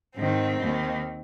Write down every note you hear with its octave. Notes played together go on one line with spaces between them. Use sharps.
G#2 D#3 C4
D#2 D#3